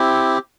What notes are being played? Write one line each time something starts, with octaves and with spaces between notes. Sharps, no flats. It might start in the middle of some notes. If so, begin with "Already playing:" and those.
Already playing: C4 E4 G4